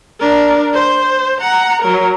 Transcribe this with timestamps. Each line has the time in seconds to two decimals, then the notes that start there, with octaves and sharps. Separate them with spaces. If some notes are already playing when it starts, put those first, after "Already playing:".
0.20 D4 A#4
0.73 C5
1.41 F#5 A#5
1.82 F#3 A#4